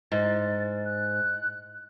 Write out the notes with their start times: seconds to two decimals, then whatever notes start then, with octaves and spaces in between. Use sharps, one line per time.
0.12 G#2 A6
0.85 F#6